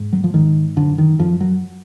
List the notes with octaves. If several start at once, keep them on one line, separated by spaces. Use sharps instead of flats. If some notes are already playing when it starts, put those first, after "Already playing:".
Already playing: G#2
F#3
F3
G#2 D#3
F#2 D3
D#3
F#2 F3
F#3